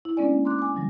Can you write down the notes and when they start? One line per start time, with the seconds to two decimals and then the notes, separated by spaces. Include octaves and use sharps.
0.05 E4
0.17 G#3 B3 C#4 D4 D5 G#5
0.29 A#3
0.45 A#5 C6 D6 F#6
0.59 G#5 D6
0.74 D3 E3 F#3 G3